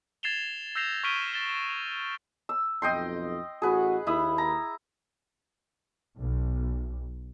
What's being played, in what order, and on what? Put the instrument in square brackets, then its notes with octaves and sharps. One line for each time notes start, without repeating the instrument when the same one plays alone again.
[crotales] G#6 A6 C7 E7 F7 G7
E6 G6 A#6 C7 E7 F7
C#6 F6 B6 D7 D#7 G7
A6 G7
F7
[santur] E6
[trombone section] B1 F2 [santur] D#5 G5 C6
[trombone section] A1 F#4 [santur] G#4 B4
[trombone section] D#2 [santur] E4 B5 D#6
[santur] A#5
[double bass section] B1